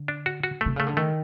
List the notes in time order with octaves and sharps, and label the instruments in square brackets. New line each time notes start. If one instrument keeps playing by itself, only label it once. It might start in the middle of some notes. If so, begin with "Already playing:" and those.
Already playing: [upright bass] D3
[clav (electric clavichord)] D4
F#4
F#4
[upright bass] C3 [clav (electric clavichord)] A3
[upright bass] C#3 [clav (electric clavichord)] A3
[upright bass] D3
[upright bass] D#3 [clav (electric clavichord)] A3